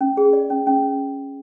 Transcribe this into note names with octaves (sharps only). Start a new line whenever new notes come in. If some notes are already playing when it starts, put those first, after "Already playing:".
C#4
G#4
D5
C#4
C#4